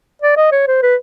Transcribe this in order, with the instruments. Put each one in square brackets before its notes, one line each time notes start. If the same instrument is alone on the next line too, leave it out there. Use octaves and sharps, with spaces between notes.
[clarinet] D5
D#5
C#5
C5
B4